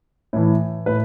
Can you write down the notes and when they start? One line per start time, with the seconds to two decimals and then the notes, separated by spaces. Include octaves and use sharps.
0.33 A2 E3
0.86 A2 B4